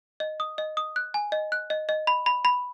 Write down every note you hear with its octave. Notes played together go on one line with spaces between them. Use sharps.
D#5
D#6
D#5
D#6
F#6
G#5
D#5
F#6
D#5
D#5
B5
B5
B5